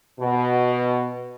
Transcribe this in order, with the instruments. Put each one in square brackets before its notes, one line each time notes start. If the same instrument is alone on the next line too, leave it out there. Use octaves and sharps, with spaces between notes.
[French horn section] B2